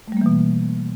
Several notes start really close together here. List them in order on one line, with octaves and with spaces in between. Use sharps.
A3 G3 A#3 E3 B2